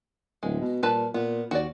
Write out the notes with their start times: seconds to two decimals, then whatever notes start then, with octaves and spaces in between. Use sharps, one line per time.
0.43 D1 G#3
0.61 B2
0.83 A#2 G3 B4 A5
1.14 A#2 B3
1.51 D#2 F#4 D5